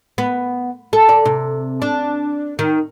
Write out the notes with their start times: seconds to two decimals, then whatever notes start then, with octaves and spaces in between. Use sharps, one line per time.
0.18 B3
0.93 A4
1.09 D5
1.25 C3
1.82 D4
2.59 D#3